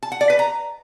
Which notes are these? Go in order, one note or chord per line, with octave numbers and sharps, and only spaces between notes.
A5
F#5
D5
B4
A#5